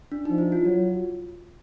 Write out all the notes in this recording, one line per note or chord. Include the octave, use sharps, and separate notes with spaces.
D4
F3 D#4
E4
F4
F#3 F#4